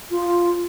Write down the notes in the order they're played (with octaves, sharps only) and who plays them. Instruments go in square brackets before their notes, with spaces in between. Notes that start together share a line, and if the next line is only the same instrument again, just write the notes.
[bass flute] F4